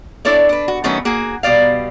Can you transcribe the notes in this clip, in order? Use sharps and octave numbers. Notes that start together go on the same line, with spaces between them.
D4 E4 A4 C#5 D5
D4 B4
F#4
D#3 F#3 A3 B3 C#4
A#3 F#4 G#4
B2 G3 D5 F5